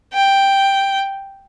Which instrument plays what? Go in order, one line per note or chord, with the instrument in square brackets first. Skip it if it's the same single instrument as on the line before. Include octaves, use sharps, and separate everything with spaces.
[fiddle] G5